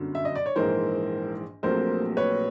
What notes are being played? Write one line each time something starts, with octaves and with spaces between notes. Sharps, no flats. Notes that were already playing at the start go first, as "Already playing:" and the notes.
Already playing: G1 F#2 D3 F#3
E5
D#5
D5
C#5
A#1 G#2 E3 A#4 C5
A#1 A#2 F#3 A3 C4 A#4 C5
B4 C#5